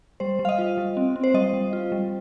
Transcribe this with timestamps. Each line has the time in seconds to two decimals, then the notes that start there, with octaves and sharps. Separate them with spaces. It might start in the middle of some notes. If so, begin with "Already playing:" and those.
0.20 G3 C5
0.39 G3
0.45 F5
0.49 D#5
0.58 F4
0.77 G3
0.97 C4
1.16 C4
1.24 C5
1.34 G3 D#5
1.53 G3
1.73 F4
1.92 G3